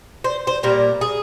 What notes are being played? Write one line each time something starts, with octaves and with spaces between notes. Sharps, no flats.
C5
C5
A#2 G3 A#3 A#4
G#4